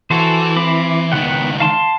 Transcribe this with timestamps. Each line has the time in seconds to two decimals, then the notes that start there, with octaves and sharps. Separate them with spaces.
0.10 E3 F#4 A4 C5
0.56 C4 B5 D6
1.12 C#2 D#3 B3 F#5 G5
1.60 F5 A5 C6